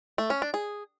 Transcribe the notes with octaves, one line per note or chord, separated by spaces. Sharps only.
A3
C#4
D4
G#4